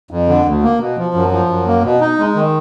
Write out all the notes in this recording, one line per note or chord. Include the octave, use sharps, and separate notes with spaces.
F2
D3
D2
A#3
B2
F3
F#2
F3
F#2
A#3
B2
D#4
G#3
D#3